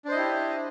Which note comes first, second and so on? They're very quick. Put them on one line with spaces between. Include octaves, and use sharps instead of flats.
D4 C5 D#5 E4 G4